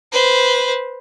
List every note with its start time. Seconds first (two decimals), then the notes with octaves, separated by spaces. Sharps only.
0.12 B4 C5